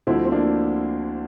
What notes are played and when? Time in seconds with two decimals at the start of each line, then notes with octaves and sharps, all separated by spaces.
0.07 D2 D3 F3 C4 E4
0.25 C4
0.32 A#3 D4